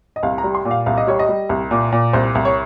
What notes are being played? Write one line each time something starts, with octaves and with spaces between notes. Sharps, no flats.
D#5
C2 F5
A#5
G3
C6
A#2
F5
C2 F5
D#5
G3 C#5
D#5
G3
C2
A#2
A#2
C2 C5
C2
C#5